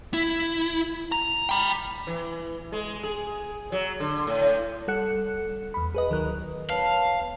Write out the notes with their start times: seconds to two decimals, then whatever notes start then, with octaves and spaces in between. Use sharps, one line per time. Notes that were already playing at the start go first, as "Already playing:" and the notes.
0.14 E4
1.12 A#5
1.49 G5 B5
2.07 E3
2.72 G#3
3.03 G#4
3.72 F#3
4.00 D3
4.27 A2
4.88 G3 A4 F#5 F#6 C#7
5.74 E2 B5
5.94 G#4 B4 D#5
6.10 D2 D#3 F#3 A#4 F#6
6.69 B3 B4 C#5 F5 A5